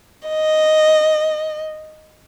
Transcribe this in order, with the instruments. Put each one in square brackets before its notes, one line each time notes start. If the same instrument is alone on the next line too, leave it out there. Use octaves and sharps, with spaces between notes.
[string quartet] D#5